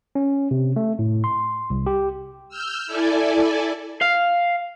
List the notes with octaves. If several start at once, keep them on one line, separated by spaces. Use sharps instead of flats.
C#4
C3
A3
A2
C6
C2
G4
E6 F6 G6
E4 A4 D5 G#5
F5